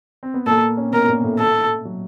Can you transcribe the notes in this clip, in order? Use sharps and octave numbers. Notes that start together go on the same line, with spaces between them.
C4
B3
A#2 A#3 A4
C#4
C4
B2 B3 A#4
A#2 A#3
A2 A3
A4
F#3